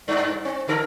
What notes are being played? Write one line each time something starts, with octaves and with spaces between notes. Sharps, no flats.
G2
C4
D3 A4 A#4